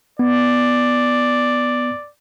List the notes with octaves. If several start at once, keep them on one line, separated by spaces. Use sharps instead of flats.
B3 D5